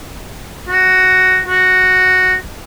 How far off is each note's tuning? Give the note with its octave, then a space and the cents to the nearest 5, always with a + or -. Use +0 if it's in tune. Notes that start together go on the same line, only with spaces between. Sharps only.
F#4 +5
F#4 +0